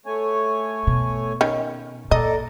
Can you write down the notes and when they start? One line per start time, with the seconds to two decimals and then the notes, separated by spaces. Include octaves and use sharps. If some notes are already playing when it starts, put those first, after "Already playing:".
0.06 A3 C#5 G#5
0.87 B2
1.41 D#3 C#4
2.11 A#2 A4 D5 D#5 A#5